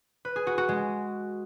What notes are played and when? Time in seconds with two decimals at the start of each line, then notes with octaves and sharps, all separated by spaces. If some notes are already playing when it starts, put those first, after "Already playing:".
0.25 B4
0.36 G#4
0.47 F#4
0.58 F#4
0.69 G#3